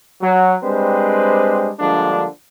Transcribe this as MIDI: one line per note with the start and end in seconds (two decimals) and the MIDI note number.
0.21 0.54 54
0.63 1.69 55
0.63 1.69 56
0.63 1.69 60
0.63 1.69 62
0.63 1.69 71
0.63 1.69 72
1.80 2.25 50
1.80 2.25 53
1.80 2.25 55
1.80 2.25 56
1.80 2.25 58
1.80 2.25 62